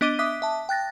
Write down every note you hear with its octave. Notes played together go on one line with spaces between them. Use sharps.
B3 D4 D#5 D6 D#7 G7
E5 D6 D#6 F#6 B6
E5 A5
G5 F#6 A6 A#6